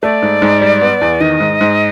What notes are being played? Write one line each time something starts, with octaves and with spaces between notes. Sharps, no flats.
A3 D5
G#2
G#2
G3
B3
E2
D#3 D#5
G#2
G#2